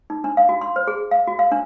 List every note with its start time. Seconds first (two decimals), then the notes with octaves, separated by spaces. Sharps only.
0.10 D#4
0.24 D4
0.37 F5
0.49 F#4
0.61 C6
0.76 C5
0.87 G#4
1.11 F5
1.27 F#4
1.39 F5
1.52 D4